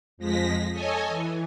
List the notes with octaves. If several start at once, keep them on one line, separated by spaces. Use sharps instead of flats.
F2 F3 G#3 A#6 B6
A4 C#5 D#5 G#5
E3